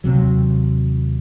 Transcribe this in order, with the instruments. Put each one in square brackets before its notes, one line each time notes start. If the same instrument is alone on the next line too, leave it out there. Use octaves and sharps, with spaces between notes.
[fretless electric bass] D#2 C3 F#3